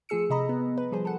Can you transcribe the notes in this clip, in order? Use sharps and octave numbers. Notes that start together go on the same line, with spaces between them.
F3 A3 G#4 E6 C#7
C3 D#5 A#5 B5
B3
B4
F3 G3 G#4 C5
A4 F#5